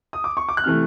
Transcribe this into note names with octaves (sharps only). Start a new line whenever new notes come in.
D#6
D6
C#6
D6
F#6
C3 E3 A3 F6